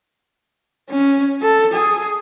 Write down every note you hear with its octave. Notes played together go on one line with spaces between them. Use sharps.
C#4
A4
G#4